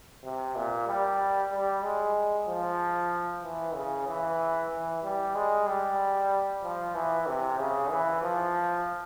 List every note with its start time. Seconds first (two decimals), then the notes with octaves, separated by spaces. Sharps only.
0.24 C3
0.56 A#2
0.88 G3
1.52 G3
1.83 G#3
2.47 F3
3.43 E3
3.75 C#3
4.07 E3
4.71 E3
5.03 G3
5.35 G#3
5.67 G3
6.63 F3
6.95 E3
7.27 C3
7.58 C#3
7.90 E3
8.22 F3